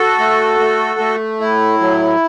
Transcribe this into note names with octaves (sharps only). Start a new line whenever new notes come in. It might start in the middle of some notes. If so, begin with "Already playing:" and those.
Already playing: F#4 A4
A3
A3
A3
A2 E4
F#3